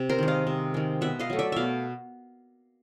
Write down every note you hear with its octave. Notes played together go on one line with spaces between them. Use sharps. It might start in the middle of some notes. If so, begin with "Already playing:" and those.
Already playing: C3
A#4 C5
D#3 G#3
D#5 F5
C3
D#3 G#3
B2 E5 F#5
D#5 F5
F#3 A3
D5 E5
B2 E5 F5